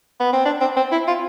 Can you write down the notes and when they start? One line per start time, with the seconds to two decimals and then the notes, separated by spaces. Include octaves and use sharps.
0.20 B3
0.33 C4
0.45 D4
0.61 C4
0.77 C4
0.92 E4
1.07 F4